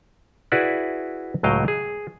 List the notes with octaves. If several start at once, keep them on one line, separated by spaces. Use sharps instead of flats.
E4 F#4 G#4 B4 D5 E5
C#2 A2 F#3 D#5 F5 G5
G#4